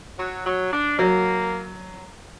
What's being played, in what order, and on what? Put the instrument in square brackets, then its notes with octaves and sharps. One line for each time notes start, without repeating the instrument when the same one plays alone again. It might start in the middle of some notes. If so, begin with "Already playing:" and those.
[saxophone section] F#3
F#3
D4
[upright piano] F#3 [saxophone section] A#3